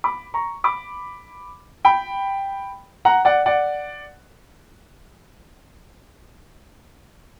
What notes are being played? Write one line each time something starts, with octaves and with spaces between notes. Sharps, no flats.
B5 D6
A#5 C#6
B5 D6
G5 B5
F#5 A#5
D5 F#5
D5 F#5